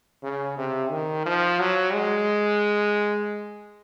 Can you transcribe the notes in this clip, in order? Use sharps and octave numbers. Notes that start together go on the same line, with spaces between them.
C#3
C3
D#3
F3
F#3
G#3